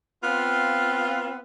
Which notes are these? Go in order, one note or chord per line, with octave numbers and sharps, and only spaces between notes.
B3 C4 F4